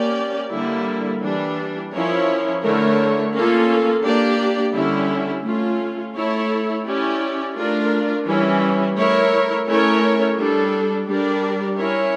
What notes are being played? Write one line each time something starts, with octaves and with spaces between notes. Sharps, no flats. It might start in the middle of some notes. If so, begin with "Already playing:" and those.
Already playing: A#3 C#4 G4 D5
D3 G3 A#3 E4
E3 G3 D4
F3 C#4 E4 A#4 C#5
D3 A3 E4 A#4 C#5
A#3 C#4 F4 A4
A#3 D4 G4 D5
D3 G3 C#4 E4
A3 C#4 F4
A3 E4 A4 C#5
C#4 E4 G4 D5
A3 D4 F4 A#4 D5
E3 G3 C#4 E4
A3 E4 A#4 C#5
A3 C#4 E4 A#4 C#5
G3 D4 A4
G3 D4 G4 A#4 D5
C#4 E4 A#4 C#5